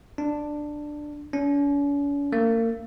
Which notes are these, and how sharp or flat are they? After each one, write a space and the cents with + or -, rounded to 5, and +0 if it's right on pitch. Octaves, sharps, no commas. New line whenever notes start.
D4 +10
C#4 +45
A#3 -35